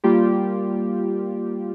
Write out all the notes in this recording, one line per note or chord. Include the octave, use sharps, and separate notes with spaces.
G3 A#3 F4 G4